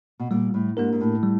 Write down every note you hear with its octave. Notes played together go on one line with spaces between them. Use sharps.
B2
A#2 G3
A2
G#2 A#3 D4 G4 A#4
G#2
A2
G3